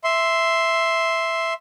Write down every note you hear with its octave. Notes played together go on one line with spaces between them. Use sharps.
E5 C6